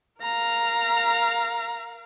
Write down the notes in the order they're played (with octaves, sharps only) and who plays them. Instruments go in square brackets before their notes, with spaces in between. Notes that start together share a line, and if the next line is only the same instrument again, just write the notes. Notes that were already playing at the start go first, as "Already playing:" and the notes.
[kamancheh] A#4 F5 [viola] A#5